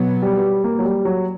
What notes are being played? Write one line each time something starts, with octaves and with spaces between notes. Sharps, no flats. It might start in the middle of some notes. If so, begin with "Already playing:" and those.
Already playing: B2 F#3 B3
G3
A#3
F#3
G3
F#3